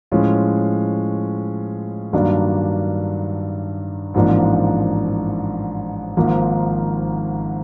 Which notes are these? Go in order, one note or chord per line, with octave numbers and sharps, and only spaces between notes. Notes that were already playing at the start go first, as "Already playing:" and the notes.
A2 F3 G#3 C#4 F4
G2 D#3 F#3 A#3 D4
A1 G#2 F3 A#3 D4
G#1 G#2 F3 A#3